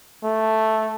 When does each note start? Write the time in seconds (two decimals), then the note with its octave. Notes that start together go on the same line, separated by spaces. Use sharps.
0.24 A3